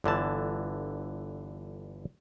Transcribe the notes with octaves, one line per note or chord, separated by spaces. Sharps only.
G1 D3 E3 A5